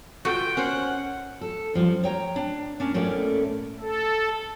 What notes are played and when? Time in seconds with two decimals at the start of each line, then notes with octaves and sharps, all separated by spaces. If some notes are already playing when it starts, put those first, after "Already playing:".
0.25 F4 F#4 A4 B4 G5
0.57 C#4 A#4 C5 F#5
1.41 A4
1.74 F#2 F3 G3
2.03 C#5 G5 A#5
2.36 D4
2.80 A#3 C#4 D4
2.94 A2 A3 A#3 C#4 D5
3.80 A4